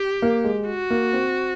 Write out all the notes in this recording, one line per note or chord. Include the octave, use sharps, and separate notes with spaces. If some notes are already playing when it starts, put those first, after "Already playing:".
Already playing: G4
A#3
G#3
F#4
A#3
C4